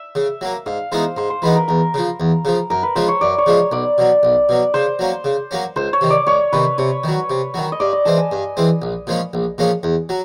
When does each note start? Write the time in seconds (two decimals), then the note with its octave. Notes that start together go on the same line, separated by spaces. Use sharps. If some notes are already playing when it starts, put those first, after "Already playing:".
Already playing: E5
0.15 C#3
0.41 F#3 A#3
0.66 G#2 F5
0.92 E3 G#3 B3 D#4 C5
1.17 G#2 C5
1.30 C5
1.42 E3 G#3 B3 D#4 B4
1.55 A#4
1.68 E2 A#4
1.94 C#3 F3
2.20 E2
2.45 C#3 F3
2.70 F#2 A#4
2.83 B4
2.95 C#3 F3 G#3 C5
3.08 C#5
3.21 F#2 D5
3.38 C#5
3.46 C#3 F3 G#3
3.72 B1 D5
3.98 B2 F#3
4.23 B1
4.49 B2 F#3
4.74 C#3 C5
4.99 F#3 A#3 C#4
5.24 C#3
5.51 F#3 A#3 C#4
5.76 C#2 C5
5.93 C#5
6.01 C3 D#3
6.10 D5
6.27 C#2 C#5
6.52 C3 D#3 B4
6.78 C3 C#5
7.04 D#3 F#3
7.30 C3
7.54 D#3 F#3
7.72 D#5
7.80 G2 D5
7.93 D#5
8.05 E3 G#3 C4 A5
8.18 G#5
8.32 G2
8.57 E3 G#3 C4
8.82 A#1
9.07 A#2 F3 G#3 C#4
9.33 A#1
9.58 A#2 F3 G#3 C#4
9.83 E2
10.09 F#3